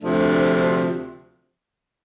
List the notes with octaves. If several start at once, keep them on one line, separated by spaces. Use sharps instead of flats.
D2 C3 F3 A3 D4